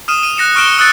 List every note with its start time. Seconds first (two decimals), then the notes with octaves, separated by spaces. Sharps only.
0.08 D#6 F6 D#7 E7
0.23 D#7
0.37 F#6 A#6 C#7 E7
0.56 C#6 F6 C#7 D7 E7 G7
0.78 D#6 E6 F#6 A6 C#7